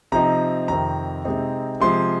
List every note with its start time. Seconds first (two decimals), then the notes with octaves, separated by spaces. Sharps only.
0.12 C3 F3 C4 D#4 A#5
0.68 F2 C3 D#3 C4 A#5
1.24 C3 G#3 C4 D#4
1.80 C3 F3 G#3 C6